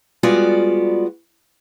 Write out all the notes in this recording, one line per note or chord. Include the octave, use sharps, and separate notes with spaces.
G3 G#3 B3 F4 F#4 D5